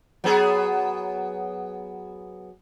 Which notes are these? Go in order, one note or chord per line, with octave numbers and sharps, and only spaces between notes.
F#3 B3 G#4